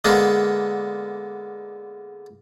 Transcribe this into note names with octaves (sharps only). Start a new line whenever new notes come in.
D3 G#3 A#3 B3